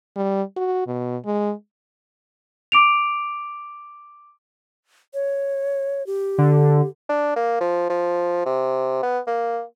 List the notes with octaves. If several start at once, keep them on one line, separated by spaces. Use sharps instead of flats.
G3
F#4
B2
G#3
D6 D7 F7
C#5
G4
D3
D4
A#3
F3
F3
C3
B3
A#3